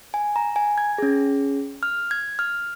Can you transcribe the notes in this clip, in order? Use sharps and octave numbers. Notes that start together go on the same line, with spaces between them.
G#5
A#5
G#5
G#6
C#4 G#4
F6
G#6
F6